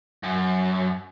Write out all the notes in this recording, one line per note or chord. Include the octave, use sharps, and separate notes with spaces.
F#2